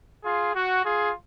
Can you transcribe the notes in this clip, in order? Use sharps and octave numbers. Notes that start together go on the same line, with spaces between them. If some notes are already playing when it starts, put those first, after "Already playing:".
F4 G#4
F#4
F4 G#4